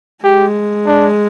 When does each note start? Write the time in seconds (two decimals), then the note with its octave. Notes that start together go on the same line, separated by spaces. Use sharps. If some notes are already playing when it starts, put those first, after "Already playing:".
0.24 G#3 G4
0.86 D4